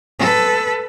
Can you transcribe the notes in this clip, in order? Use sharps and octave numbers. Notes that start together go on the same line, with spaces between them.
A4 B4